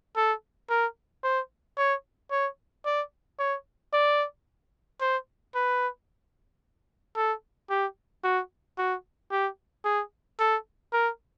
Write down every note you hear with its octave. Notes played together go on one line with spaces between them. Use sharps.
A4
A#4
C5
C#5
C#5
D5
C#5
D5
C5
B4
A4
G4
F#4
F#4
G4
G#4
A4
A#4